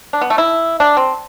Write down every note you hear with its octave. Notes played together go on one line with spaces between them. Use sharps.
D4
B3
A3
E4
D4
C4